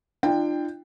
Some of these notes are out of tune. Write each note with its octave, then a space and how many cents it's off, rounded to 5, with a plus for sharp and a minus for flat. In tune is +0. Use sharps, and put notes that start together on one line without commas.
D4 +35 F4 -35 G5 +15